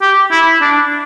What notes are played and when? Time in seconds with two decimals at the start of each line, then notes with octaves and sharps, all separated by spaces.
0.01 G4
0.31 E4
0.61 D4